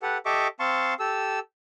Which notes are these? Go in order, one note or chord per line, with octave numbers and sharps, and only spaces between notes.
G4 A4 B4 F#5
G4 A4 D#5 E5 C#6 D6
C4 F5 A5 C6 C#6
G4 A4 E6